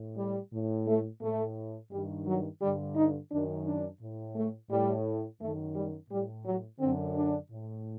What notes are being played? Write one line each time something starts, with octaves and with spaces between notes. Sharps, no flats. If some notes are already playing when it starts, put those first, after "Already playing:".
Already playing: A2
G3
A2
A3
A2 A3
G2 D#3 G3
F#3
G2 D3 G3
D#4
F#2 D#3 D4
D4
A2
A3
A2 G3
F#2 D#3 A3
G3
A2 G3
F#3
F#2 D3 C4
D4
A2